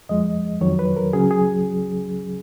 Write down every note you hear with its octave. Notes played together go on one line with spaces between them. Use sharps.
F2 F3 G#3 D#5
F2 D#3 F#3 C#5
B4
A#4
C#2 C#3 F#3 C#4 G#4
G#4